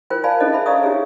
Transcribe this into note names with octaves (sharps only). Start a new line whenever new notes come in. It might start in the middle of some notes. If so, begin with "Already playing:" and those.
F4 A#4 C5 G5
D5 F5 G#5 A5 B5
C#4 D4 G#4 A4 C5 D#5
E5 B5
D5 F5 A#5 C#6 D#6
D4 G4 G#4 C#5